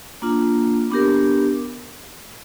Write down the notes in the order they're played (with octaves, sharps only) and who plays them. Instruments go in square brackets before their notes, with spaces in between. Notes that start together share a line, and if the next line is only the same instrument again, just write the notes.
[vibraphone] A#3 D4 F4
B3 D4 G4 A#4